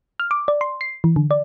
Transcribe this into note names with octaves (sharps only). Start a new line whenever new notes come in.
F6
D6
D5
C6
C7
E3
D3
D5